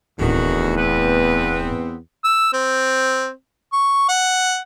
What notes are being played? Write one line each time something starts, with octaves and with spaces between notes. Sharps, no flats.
D1 E2 A2 D3 D#3 F#4
B3 C4 B4
E6
C4
C#6
F#5